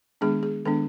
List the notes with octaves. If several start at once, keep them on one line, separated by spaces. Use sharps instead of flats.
D#3 G#3 B3 D4 G#4
G#4
D#3 G#3 B3 D4 A4